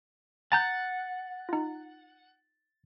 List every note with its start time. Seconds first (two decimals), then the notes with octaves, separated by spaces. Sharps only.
0.52 F#5 G#5 A#5 G6 A6
1.49 D#4 F4